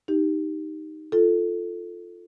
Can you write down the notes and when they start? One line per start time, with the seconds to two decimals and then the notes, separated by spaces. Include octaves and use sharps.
0.08 D#4 G4
1.12 F4 A4